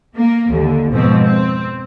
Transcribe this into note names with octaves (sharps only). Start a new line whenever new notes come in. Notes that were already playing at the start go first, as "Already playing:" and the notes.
A#3
D#2 D3
F2 G#2 B2 F3 C4
C4